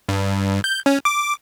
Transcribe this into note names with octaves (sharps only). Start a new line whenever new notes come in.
G2
G6
C#4
D6